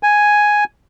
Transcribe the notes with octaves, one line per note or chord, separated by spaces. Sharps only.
G#5